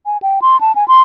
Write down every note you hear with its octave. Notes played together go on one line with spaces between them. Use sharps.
G#5
G5
C6
A5
G#5
C6